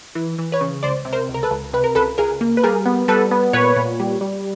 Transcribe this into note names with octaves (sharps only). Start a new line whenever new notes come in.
E3
E3
B4 C#5
C#3
C#2 C5 D5
C3
A#4 C5
C#2
A#4
A4 B4
C#2
C3 B4
A#4
C#2 A4 B4
C#2 G#4 A#4
A#3
B4
G3 G#4 A#4
B3
G3 A4 B4
B3
A#2 B4 C#5
A#2
G3
G3